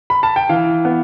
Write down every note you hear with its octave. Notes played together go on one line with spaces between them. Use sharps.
B5
A5
G5
E3 F5
B3